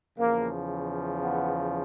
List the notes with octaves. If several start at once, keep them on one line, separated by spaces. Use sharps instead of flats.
E2 C#3 F3 A#3
B3